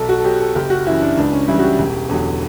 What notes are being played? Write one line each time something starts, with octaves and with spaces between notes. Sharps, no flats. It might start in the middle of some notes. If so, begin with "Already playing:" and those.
Already playing: B1 A4
F#4
A4
B2 F#3 G4
A4
F#1 G4
F#4
F#2 C#3 E3 E4
D4
C#2 D4
C#4
C#3 E3 G3 E4
F#4
G4
E1
E2 D3 F#3